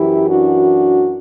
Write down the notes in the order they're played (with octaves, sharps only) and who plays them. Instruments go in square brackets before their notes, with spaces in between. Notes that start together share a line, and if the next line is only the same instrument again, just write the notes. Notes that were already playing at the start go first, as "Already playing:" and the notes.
Already playing: [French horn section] F#2 E3 E4 G4
D4 F#4